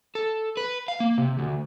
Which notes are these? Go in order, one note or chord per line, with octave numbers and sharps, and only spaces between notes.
A4
B4
F5
A#3
C3
D2